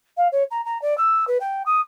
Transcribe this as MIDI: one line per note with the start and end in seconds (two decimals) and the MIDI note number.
0.17 0.28 77
0.32 0.43 73
0.51 0.64 82
0.65 0.80 82
0.82 0.97 74
0.98 1.25 88
1.28 1.38 71
1.40 1.63 79
1.66 1.80 87